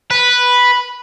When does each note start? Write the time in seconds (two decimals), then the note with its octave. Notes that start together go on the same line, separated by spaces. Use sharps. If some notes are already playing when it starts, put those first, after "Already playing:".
0.11 B4